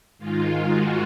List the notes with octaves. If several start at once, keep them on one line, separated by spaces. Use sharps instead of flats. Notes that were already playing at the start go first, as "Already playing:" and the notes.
G#2 D#3 G#3 F4
F#4